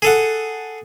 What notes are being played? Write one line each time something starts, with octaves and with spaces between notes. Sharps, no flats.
G#4 A4 F#5